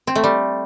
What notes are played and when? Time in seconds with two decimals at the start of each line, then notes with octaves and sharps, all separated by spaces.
0.07 C4
0.15 A3
0.24 G3